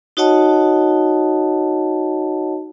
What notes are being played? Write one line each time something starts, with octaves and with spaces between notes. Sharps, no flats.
D#4 F#4 C#5 D#5 F#5 A5